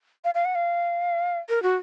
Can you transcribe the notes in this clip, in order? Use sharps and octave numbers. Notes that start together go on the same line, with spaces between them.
F5
F5
F#5
F5
A#4
F#4